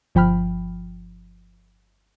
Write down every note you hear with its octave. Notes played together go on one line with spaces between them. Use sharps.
G1 F3 G5 B5 F6